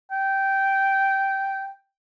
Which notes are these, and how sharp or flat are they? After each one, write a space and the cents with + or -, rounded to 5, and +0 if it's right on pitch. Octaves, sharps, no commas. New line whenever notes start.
G5 -10